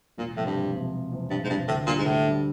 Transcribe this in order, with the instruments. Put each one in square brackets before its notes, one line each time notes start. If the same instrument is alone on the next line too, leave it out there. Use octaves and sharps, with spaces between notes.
[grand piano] E1 [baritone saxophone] A#2
[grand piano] E2 C3 F3 [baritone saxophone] A2
[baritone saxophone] G2
[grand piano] E1
E2 C3 F3
E1
E2 C3 F3
[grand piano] E1 [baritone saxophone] G2
[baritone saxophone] G#2
[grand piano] E2 C3 F3 [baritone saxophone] G2
[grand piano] D2 [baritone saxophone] A2
[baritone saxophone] A#2 [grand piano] D3 G3
[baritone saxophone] G#2
[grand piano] D2 [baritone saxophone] A2
[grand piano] D3 G3